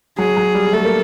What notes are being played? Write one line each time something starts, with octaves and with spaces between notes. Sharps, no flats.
F#3 G#4
F#3
G3
A3 A4
A#3